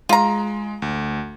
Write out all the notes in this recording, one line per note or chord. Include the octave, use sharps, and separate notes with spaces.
G#3 F4 A#5
D2